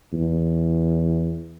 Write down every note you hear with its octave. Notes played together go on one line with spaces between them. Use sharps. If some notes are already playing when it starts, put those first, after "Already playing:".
E2